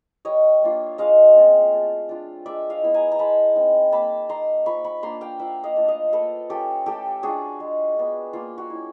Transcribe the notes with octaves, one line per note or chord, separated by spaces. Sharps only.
G3 C#5 D#5
A#3 D4 F4
G#3 D#5 F5
C4 F4
A3
D4 F4
G#3 D5 E5
D#5 F5
B3 E4
G#5 A#5
A#5
G#3 A5 B5
C4 D#4
A#3 A5 B5
D#4 A#5 C6
F3 B5 C#6
B5 C#6
A#3 D4 A#5 C6
F5 G5
F3 E5 F#5
D#5 F5
A3 D4 F4
D#5 F5
A#3 A4 B4
C#4 F4 G4 A4
A3 G4 A4
D4 F4 F#4 G#4
G#3
B3 D4
A#3 F4
F#4
C#4 E4